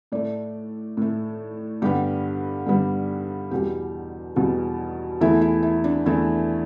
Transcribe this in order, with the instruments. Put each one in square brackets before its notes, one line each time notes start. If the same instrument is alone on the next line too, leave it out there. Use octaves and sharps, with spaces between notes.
[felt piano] A2 A3 D5
A2 A3
G2 D3 G3 B3 G4
G2 D3 G3 B3
E2 B2 G3 G4
E2 B2 G3
E2 E3 A3 E4
E4
E4
D4
E2 E3 A3 E4